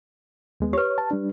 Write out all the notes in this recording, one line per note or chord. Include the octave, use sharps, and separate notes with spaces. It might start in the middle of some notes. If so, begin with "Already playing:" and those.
D#2 G#3 B3
G4 B4 C#5
A5
G3 D4